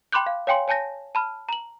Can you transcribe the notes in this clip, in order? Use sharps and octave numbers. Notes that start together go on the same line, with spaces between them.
G5 B5 C6 D6 F#6 G6
F5
C#5 F5 G5 G#5 C6
C#5 G#5 A5 G6 A#6
A5 B5 F6
A#5 F#7